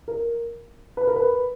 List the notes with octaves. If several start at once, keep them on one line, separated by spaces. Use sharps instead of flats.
A#4
B4
A#4
B4